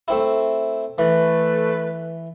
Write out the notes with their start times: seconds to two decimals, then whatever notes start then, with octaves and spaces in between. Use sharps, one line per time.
0.08 A3 C4 E4
0.98 E3 A3 B4